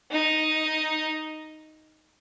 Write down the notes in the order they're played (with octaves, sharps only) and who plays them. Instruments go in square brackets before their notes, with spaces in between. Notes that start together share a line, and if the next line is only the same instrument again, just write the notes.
[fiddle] D#4